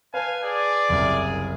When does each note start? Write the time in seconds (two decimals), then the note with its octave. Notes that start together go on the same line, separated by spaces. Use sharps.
0.14 B4 F5 G#5 A5
0.44 G#4 D5
0.89 F#1 C2